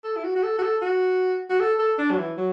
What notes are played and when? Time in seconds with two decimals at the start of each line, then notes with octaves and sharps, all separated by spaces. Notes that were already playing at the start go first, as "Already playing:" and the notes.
0.04 A4
0.17 E4
0.24 F#4
0.36 F#4
0.43 A4
0.59 F#4
0.63 A4
0.82 F#4
1.50 F#4
1.60 A4
1.79 A4
1.99 D4
2.11 F#3
2.19 E3
2.37 F#3